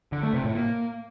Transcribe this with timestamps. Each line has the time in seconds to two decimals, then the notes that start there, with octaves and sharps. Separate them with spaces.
0.12 D3
0.23 A3
0.34 C3
0.44 A2
0.55 A#3